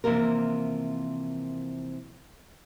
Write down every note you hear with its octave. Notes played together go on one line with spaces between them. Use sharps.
C3 E3 F3 A#3 A#4